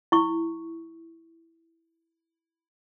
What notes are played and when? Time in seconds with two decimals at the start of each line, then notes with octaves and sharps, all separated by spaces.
0.12 E4 C#6